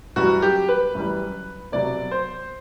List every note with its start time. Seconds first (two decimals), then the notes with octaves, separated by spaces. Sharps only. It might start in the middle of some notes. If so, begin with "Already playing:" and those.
0.16 F#2 E3 G3 F#4
0.42 G4
0.69 B4
0.95 F#2 E3 G3
1.72 C2 B2 F#3 D5
2.11 C5